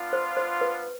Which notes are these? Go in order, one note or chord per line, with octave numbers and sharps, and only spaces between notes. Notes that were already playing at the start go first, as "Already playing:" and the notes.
Already playing: B3 D4 F4
C5
C5
B4